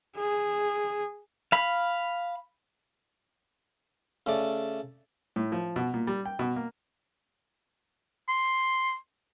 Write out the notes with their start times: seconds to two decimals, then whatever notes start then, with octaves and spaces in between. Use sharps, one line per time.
0.16 G#4
1.52 F5 B5
4.26 C#3 A3 D5
5.36 A2
5.52 F3
5.76 B2
5.94 A#2
6.07 G3
6.25 G5
6.39 B2
6.56 A#3
8.29 C6